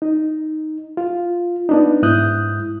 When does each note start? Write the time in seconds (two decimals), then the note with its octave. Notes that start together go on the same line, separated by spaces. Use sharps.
0.02 D#4
0.97 F4
1.69 B3 D4 D#4
2.03 G#2 E4 D#6 F#6 G6